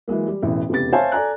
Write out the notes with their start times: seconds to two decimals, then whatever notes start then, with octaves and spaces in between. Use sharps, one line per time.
0.08 E3 F#3 G#3 A#3
0.27 G3
0.42 E1 A1 E3
0.70 F1 E2 C#3 G4 A6
0.93 C5 C#5 E5 F5 G#5 A5
1.12 A4 D5 G#5 A#5 F#6